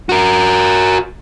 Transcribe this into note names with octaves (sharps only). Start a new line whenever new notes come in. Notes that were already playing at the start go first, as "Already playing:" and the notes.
F#4 A#4